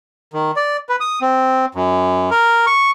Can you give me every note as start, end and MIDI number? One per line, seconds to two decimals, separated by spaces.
0.33 0.51 51
0.56 0.77 74
0.89 0.96 71
1.00 1.19 87
1.22 1.66 60
1.75 2.30 42
2.31 2.66 70
2.67 2.91 85